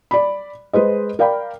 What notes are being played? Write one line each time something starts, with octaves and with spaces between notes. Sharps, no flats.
D5 B5
G#3 B4 C5 D#5
A#4 D5 F5 G5 B5